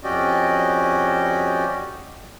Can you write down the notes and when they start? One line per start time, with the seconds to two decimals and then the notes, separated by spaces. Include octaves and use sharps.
0.04 F2 C#4 F#4 G4 D5 D#5